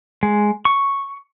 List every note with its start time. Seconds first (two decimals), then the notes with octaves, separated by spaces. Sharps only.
0.23 G#3
0.65 C#6